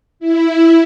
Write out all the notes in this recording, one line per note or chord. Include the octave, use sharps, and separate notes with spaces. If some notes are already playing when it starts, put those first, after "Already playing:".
E4